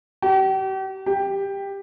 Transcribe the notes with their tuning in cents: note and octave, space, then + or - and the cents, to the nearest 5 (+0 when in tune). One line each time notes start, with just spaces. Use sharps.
G4 -40
G4 +10